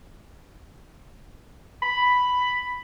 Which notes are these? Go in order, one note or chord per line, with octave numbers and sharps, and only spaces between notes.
B5